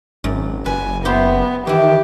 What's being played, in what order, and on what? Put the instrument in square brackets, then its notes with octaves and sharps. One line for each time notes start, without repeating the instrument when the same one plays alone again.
[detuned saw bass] G#1 [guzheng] F#2
[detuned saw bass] F#1 [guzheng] B4 [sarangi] G#5
[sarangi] B3 [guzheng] E4 G4 C5
[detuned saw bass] D#3 [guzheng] E3 E4 [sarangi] G4